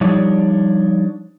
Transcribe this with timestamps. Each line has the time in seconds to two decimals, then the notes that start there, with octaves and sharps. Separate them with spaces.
0.01 F3 G3 D4 D#4 C#5 D5